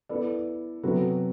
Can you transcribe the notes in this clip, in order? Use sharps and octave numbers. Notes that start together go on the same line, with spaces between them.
B3 E4 A4 D5
C3 F#3 B3 F#4 A4